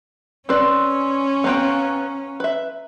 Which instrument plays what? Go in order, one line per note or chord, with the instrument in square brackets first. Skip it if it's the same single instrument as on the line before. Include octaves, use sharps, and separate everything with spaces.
[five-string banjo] C4 B4 D5 [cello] C#4 [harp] C6 E6
[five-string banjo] B3 C4 G5 [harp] F5 A#5 F#6
[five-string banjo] B4 E5